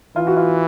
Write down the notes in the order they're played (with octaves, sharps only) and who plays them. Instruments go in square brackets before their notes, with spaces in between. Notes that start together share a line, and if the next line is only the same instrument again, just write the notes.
[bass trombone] E3 [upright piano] F4
[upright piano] F#4
F4